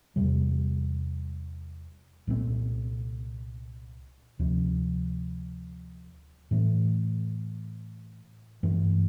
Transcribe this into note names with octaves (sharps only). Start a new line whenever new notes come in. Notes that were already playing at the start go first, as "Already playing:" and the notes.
E2 C3 G3
C2 A#2 G3 C4
D2 C3 F3
A2 E3 A3
G2 E3 A3